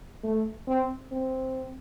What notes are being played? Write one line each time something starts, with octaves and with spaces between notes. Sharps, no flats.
A3
C4
C4